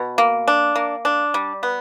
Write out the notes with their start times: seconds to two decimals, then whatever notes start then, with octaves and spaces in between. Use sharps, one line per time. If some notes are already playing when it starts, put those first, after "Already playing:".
Already playing: B2
0.18 A#3
0.48 D4
0.76 A#3
1.05 D4
1.34 G3
1.63 B3